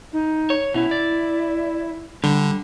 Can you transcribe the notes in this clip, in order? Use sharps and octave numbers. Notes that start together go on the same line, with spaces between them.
D#4
C#5
B2 C#4 E4
D5
D3 G3